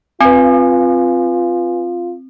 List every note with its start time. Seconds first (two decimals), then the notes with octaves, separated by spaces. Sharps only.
0.21 C4 F4 B4 G#5